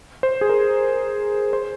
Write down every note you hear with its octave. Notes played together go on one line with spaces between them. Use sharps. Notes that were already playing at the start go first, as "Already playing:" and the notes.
C5
G#4
A#4
C5